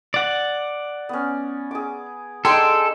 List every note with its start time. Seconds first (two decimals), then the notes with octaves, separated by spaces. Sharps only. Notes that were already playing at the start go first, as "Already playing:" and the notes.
0.14 D5 F#5
1.09 B3 C#4
1.71 G#4 D6
2.45 D4 D#4 G#4 A4 G5 C6